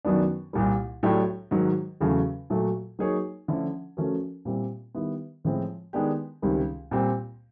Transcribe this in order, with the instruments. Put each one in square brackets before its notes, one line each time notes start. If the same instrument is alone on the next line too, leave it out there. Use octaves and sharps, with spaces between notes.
[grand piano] F#2 D#3 F#3 B3 D4
C2 A#2 G3
A2 F#3 A3 D4 G4
G#2 D#3 F#3
E2 C#3 F#3 A3
A#2 F#3 A3
F#3 A#3 D#4 G#4 C#5
D3 F3 A3 C#4 E4
F3 A3 C#4 F#4 A#4
A#2 G3 C4 E4
D#3 G3 B3 E4
A2 F3 G#3 C4 E4
D#3 G#3 B3 D4 G4
C#2 C3 D#3 G3
A#2 G3 C4